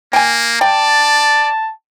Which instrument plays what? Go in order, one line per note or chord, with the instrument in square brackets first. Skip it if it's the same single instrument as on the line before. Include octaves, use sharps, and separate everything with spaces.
[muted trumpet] A#3 [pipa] G5 G#5
[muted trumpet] D5 [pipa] G5 [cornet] A5